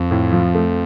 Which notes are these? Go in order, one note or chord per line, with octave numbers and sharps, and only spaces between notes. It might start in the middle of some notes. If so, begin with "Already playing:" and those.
Already playing: F2
A2
F3
A3